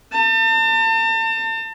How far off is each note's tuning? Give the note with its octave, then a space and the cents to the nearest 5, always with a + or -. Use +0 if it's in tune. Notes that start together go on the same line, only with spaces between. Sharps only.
A5 +40